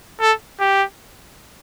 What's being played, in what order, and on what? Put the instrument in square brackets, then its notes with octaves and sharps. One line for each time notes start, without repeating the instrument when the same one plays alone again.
[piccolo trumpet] A4
G4